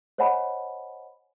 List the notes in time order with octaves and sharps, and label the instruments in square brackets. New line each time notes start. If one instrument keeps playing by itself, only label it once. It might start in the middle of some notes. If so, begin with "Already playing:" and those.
[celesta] C5 C#5 D#5 F#5 G#5 B5